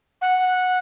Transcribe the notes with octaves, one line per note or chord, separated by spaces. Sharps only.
F#5